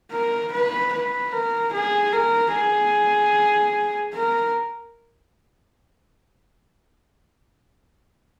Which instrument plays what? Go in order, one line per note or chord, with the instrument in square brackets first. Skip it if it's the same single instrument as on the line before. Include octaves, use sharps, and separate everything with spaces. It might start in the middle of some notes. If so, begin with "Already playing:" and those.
[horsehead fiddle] A#4
B4
B4
A#4
G#4
A#4
G#4
A#4